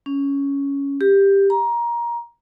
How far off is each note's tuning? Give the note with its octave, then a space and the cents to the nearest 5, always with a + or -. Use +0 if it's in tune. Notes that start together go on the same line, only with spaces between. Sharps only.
C#4 +10
G4 +10
A#5 +20